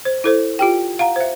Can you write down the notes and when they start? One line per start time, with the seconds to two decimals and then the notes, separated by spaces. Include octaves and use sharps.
0.05 C5
0.24 E4 A4 C5
0.59 F4 G4 G5
0.99 F5 F#5 A#5
1.16 C5 E5